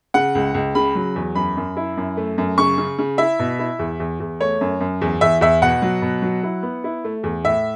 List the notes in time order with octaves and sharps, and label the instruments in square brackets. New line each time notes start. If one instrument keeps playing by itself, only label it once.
[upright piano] C#3 F#5
C#2
C#2
C#3 B5
F#3
E2
F#2 B5
F#2
E4
F#2
A3
F#2
C#3 C#6
C#3
C#3
E4 E5
B2
E4
E2
E2
E2
A3 C#5
F#2
F#2
E2
E2 E5
E2 E5
B2 F#5
F#3
B2
F#3
E4
B3
E4
A3
E2
A2 E5